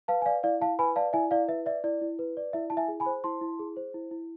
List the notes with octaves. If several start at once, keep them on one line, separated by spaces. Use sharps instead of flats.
B4 F5 A5
G#5
D5 F5
E4 D5 F5
E4 F5 A5
B4 G#5 B5
D5 F5 A5
E4 E5 G#5
E4 D5 F5
B4 E5
D5 E5
E4 D5
E4
B4
D5
E4 E5
E4 A5
E5 G#5
G#4
G#5 B5
C5
E4 A5 C6
E4
G#4
C5
E4
E4